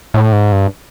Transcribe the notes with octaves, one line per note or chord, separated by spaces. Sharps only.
A2
G#2
G2